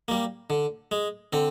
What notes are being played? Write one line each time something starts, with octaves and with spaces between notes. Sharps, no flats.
G3 A#3
D3
G#3
D3 C4